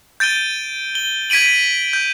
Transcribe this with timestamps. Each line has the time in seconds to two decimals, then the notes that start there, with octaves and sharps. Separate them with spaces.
0.20 G6 A6 D7 D#7 G7
0.95 G7
1.30 G#6 B6 D7 D#7 F#7
1.93 G6